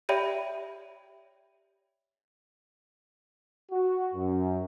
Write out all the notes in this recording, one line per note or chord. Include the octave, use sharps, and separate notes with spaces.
G4 C#5 D5 E5 G5 B5
F#4
F#2